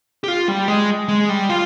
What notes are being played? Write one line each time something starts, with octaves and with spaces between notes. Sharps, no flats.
G4
F4
G3
G#3
G#3
G3
F4